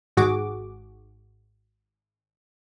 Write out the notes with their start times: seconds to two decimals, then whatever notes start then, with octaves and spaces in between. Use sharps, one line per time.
0.17 G#1 G#2 F#4 G#4 D6